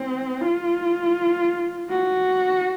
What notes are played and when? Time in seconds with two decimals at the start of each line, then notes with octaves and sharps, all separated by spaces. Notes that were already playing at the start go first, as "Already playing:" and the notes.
Already playing: C4
0.41 F4
1.90 F#4